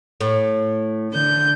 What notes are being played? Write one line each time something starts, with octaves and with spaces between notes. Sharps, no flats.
A2
D3 G6